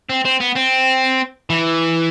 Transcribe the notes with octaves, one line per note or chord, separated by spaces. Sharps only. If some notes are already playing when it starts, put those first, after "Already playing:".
C4
C4
B3
C4
E3